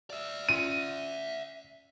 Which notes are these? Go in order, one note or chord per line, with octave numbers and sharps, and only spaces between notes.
D5 E5
C#4 F4 D#7